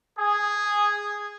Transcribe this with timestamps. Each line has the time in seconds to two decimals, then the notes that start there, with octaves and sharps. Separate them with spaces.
0.17 G#4